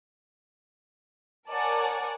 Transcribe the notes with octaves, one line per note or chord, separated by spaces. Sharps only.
A#4 C#5 D5 F#5 G#5 A5